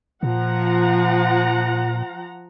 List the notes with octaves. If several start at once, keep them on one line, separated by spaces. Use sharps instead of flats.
A#2 F3 F#5 A#5